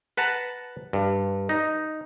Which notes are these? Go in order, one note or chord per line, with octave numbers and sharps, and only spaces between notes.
B4 F#5 A5 A#5
G2
D#4